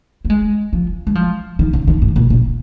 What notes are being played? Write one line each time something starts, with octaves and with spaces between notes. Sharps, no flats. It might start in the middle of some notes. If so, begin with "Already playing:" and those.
A#3
G#3
F3
G#3
F3
D#3
C#3
D#3
G#2
A#2
A#2